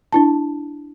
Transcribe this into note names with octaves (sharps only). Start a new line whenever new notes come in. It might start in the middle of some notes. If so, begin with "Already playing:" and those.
D4 E4 A5